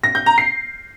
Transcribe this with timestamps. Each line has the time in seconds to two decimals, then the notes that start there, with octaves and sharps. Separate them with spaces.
0.04 A#6
0.15 G6
0.26 A#5
0.38 C7